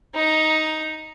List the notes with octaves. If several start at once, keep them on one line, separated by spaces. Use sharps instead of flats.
D#4 A#5